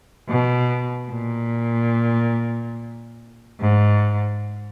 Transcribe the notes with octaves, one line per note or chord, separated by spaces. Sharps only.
B2
A#2
G#2